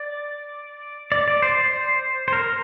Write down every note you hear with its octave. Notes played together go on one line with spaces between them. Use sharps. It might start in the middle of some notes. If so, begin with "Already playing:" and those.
Already playing: D5
D5
D5
C5
C5
C5
A#4